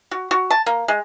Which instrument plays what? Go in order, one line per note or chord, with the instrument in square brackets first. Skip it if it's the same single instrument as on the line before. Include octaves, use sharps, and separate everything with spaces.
[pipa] F#4
F#4
A5
A#3
G#3